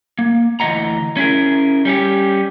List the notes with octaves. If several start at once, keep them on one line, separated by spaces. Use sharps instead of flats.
A#3
D2 E3 C#4 D#5 F#5 A#5
C#4 E4 G#4 A#4
G3 C#4 G4